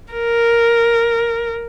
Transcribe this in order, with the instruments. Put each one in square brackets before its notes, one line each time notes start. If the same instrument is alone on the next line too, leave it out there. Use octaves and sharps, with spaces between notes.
[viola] A#4